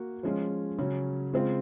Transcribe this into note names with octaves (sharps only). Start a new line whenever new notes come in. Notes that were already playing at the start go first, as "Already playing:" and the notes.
Already playing: A#3 F#4
F3 G#3 C#4 F4
C#3 F#3 C#4
C#3 G#3 C4 F4